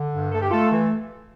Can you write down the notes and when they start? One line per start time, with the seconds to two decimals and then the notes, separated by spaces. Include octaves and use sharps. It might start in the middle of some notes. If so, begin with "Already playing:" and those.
Already playing: D3
0.12 G2
0.32 A3 A4
0.42 G4
0.51 A3 F4 A4
0.71 E3